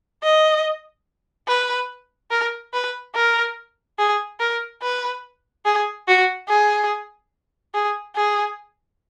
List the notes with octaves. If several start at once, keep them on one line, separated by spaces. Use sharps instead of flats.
D#5
B4
A#4
B4
A#4
G#4
A#4
B4
G#4
F#4
G#4
G#4
G#4